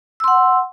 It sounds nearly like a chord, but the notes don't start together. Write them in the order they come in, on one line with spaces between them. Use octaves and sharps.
E6 C6 F#5